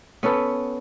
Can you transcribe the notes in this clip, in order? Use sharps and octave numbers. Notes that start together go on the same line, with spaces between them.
B3 C#4 A4 B4